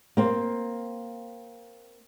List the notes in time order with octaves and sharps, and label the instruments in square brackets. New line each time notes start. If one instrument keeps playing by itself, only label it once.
[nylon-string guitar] A#3 C4